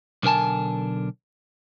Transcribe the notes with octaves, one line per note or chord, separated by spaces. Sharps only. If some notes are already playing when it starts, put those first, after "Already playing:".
B1 D3 A#4 G#5 A5